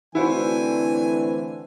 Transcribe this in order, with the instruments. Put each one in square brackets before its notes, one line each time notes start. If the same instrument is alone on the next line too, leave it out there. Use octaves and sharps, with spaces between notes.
[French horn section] D3 A3 C4 [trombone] E3 [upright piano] E4 F#4 C5 [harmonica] G#5